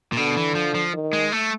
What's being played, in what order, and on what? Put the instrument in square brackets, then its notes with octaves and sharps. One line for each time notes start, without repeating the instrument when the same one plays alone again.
[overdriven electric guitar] A#2
[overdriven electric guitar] B2 [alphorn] D3
[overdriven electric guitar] E3
F3
F3
[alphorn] D#3
[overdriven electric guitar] G#3
A3